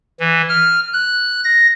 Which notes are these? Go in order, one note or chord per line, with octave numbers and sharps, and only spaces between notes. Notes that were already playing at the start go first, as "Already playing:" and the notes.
E3
F6
F#6
A#6